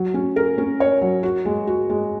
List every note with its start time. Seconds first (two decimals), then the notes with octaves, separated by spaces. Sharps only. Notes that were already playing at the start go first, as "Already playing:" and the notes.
Already playing: F#3
0.14 C#4
0.36 A#4
0.58 C#4
0.80 C#5
1.01 F#3
1.23 F#4
1.45 G#3
1.67 F#4
1.90 G#3